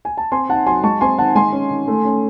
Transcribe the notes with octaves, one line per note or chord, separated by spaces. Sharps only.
G#5
A5
C4 G#5 C6
D#4 F#5 A5
F#3 G#5 C6
G#3 A5 C#6
C4 G#5 C6
D#3 F#5 A5
G#3 G#5 C6
C#4
D#3
A3
C#4